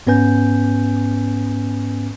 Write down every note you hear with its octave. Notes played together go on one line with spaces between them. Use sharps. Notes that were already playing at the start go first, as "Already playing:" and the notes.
G#2 B3 C#4 B4 G#5 G6